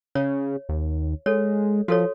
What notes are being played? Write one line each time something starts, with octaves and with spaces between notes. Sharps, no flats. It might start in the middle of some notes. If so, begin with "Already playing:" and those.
C#3 C#5
D#2
G#3 A4 C#5
F3 F#4 A4 C#5